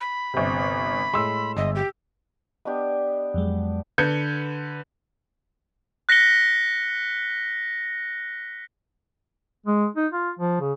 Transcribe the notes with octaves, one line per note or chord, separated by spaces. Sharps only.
B5
G1 C3
A2 G#3 C6 E6
G1 G#3 D#5 E5
G4
B3 D4 G4 D#5
F2 F#3 G#3
D3 B4 G6 G#6 C#7
F#6 A#6 B6 C#7 G7
G#3
D#4
F4
F3
C#3